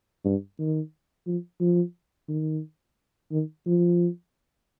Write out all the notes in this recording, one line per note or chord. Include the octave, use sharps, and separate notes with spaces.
G2
D#3
F3
F3
D#3
D#3
F3